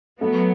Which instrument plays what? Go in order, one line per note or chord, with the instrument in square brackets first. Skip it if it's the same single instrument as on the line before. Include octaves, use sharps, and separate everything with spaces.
[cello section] F#3 B3 [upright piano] A3